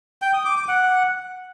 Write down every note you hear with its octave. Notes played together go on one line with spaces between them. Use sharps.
G5
D#6
D6
D6
F#5